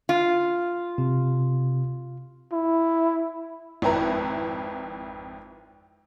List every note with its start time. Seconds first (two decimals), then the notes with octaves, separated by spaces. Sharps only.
0.09 F4
0.98 C3
2.52 E4
3.82 G#1 F2 E4 B4 A#5